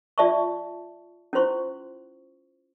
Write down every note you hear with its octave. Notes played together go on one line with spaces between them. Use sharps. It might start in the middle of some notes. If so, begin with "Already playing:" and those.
F4 D5 E5 A5 C#6
C#4 E4 F4 C5 C6 C#6